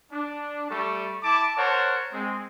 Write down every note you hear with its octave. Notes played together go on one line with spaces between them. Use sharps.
D4
G3 A3 A4 C#6
E4 A5 D6
A#4 C5 C#5 F#5 A5
G#3 C4